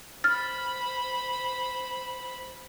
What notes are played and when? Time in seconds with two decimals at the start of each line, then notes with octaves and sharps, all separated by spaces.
0.24 C5 B5 F6 A6